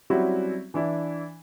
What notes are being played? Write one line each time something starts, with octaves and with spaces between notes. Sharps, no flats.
F#3 G3 C4 C#4 E4 F#4
E3 D4 E4